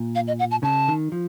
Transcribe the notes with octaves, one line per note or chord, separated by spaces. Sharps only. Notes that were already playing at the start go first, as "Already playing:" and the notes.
Already playing: A#2
F5
D#5
F#5
A5
C#3 A5
D#3
F3